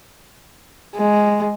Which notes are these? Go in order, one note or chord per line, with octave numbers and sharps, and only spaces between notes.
G#3